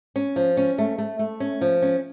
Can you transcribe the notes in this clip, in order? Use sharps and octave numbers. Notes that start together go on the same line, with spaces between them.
C#4
F3
C#4
A3
A3
A3
C#4
F3
C#4